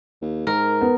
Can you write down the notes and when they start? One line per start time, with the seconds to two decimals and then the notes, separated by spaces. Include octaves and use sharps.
0.22 D#2
0.47 G#2 A#4
0.81 B3